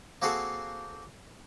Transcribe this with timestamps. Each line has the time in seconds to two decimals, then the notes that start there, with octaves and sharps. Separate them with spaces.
0.22 A#3 C4 F#4 G#4 A4 C5